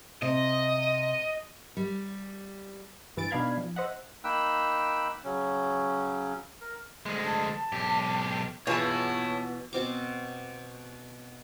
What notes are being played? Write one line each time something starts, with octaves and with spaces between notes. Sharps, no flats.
C3 D#5
G3
G2 E3 A6 D7
B2 D4 D#4 F5 B5 G#6
F3
C5 D#5 E5 F#5
A#3 D#4 G5 B5 E6 F#6
C#3 F#3 C#4
A#4
D2 G#3
A5
B1 G4
B2 E3 B3 F4 G#4 C#5 A5
B2 C4 D6